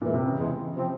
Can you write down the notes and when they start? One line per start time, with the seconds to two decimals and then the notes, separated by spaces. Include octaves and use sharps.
0.01 E2 A#2 E3 G#3
0.14 C3
0.26 C#3
0.38 E2 E3 G#3
0.75 C3 F3 C4